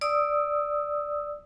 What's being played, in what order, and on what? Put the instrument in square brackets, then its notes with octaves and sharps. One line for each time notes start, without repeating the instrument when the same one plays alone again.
[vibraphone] D5 D#6 E6